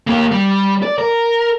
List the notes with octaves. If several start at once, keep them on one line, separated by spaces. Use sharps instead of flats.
A#3 G4
G3
D5
A#4